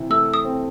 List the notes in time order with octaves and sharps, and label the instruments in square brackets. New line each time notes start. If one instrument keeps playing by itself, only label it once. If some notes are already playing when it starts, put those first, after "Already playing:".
Already playing: [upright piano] C3 E3
[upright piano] A3 [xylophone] E6
[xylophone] D#6
[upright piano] C4